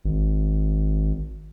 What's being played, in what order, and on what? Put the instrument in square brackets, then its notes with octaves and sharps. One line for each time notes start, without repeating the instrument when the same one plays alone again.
[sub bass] G#1